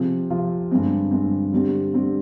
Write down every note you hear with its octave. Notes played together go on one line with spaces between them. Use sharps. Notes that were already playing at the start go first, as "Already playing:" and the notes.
Already playing: C3 F3 C4 F4 G#4
C3 F3 C4 F4 G#4
G2 D3 G#3 C4
G2 D3 G#3 C4
D3 G3 C4
D3 G3 C4